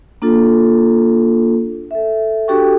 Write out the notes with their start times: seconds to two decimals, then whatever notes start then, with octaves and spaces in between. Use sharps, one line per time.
0.22 A#3 D4 F4 A4
1.91 A4 E5
2.48 D4 F#4 G4 A4 G5 C#6